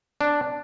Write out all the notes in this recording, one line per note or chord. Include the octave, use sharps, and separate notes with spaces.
D4